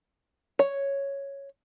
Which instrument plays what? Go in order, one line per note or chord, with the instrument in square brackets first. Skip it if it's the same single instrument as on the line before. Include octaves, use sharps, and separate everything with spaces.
[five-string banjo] C#5